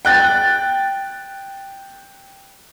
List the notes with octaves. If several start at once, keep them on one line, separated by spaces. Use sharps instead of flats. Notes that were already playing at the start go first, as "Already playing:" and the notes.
G5 F#6 A6